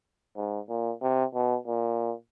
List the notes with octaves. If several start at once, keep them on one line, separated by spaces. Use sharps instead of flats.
G#2
A#2
C3
B2
A#2